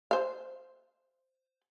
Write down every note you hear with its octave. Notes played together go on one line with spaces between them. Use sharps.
C5 F5